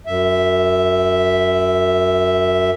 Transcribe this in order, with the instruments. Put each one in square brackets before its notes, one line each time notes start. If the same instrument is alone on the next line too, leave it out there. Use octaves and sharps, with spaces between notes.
[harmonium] F#2 E5